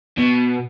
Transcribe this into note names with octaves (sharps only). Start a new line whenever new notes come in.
B2